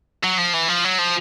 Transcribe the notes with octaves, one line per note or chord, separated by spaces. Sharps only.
F#3
F3
E3
F3
F#3
F3